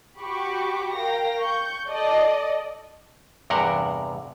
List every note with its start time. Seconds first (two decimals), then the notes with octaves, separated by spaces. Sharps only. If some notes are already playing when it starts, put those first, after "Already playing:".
0.17 F#4 G4 G5 B5 C#6 D6
0.93 A#4 F5 G5 A#6
1.38 C#6 G6
1.87 A4 D5 D#5
3.50 E2 G2 C3 A#4 F#5